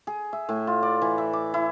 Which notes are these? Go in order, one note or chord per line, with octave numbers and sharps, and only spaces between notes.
G#4
E5
A2
F4
D5
E3
E5
D6
E4